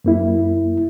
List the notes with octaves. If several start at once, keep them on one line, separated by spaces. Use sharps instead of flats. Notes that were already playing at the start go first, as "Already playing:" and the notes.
F#2 A#3 E4